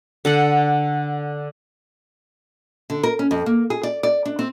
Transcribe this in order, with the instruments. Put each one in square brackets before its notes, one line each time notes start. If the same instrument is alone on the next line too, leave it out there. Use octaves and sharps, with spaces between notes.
[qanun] D3 A4 F#5
[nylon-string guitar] D3
A#4
C#4
F2
A#3
G#4
D5
D5
D4
C4